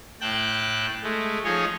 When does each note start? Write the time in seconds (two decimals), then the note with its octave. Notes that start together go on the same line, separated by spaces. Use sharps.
0.21 A2 G5 A5 F#6
1.03 G#3 A3
1.44 F3 D#4 G#4 C#5